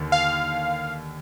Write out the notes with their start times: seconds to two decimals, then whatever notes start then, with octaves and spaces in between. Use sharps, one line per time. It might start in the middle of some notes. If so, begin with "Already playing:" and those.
Already playing: D#2 D3
0.12 F5